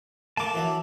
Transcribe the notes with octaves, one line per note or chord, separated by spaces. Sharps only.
A3 A#3 A#4 A5 D6
E3 F#3 E5